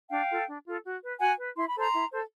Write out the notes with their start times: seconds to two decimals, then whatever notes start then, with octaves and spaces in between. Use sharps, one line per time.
0.10 D4 F5 G5
0.29 F4 A4
0.46 D4
0.66 F4 A4
0.84 F#4
1.02 B4
1.20 F#4 F#5 G#5
1.38 B4
1.56 E4 C6
1.68 B5
1.75 A4 C5 A#5 C6
1.92 E4
2.11 A4 C5